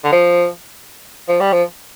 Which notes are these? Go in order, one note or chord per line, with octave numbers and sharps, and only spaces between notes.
D3
F3
F3
G3
F3